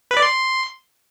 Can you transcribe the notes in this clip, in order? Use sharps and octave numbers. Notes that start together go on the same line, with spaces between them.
B4
D5
C6